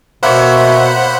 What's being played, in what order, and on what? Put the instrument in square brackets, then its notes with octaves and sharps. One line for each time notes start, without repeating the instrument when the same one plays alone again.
[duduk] B2 [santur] A#3 C#5 [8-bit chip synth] C5 F#5 B5 [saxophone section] E5